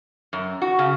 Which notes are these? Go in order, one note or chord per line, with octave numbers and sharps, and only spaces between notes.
F#2
F#4
C#3